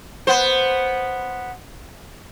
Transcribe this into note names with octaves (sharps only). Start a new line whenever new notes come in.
B3 C5